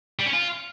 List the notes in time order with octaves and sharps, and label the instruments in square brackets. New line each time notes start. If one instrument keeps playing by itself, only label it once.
[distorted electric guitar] G3
C#4
F4